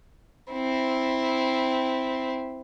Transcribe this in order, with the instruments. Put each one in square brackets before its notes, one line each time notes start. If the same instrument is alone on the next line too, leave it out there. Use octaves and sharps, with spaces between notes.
[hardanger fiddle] C4 E4